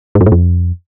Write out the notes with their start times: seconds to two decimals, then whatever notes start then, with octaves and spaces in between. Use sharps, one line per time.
0.15 G#2
0.21 F#2
0.26 A2
0.32 F2